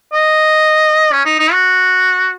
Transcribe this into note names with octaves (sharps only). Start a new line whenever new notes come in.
D#5
C#4
D#4
D#4
F#4